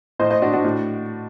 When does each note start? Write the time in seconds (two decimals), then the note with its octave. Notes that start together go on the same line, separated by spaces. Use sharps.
0.19 A2 C5 D#5
0.30 C5 D#5
0.42 D4 F#4
0.53 D4 F#4
0.64 A2